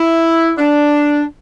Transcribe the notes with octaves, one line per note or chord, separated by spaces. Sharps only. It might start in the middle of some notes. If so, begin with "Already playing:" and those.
Already playing: E4
D4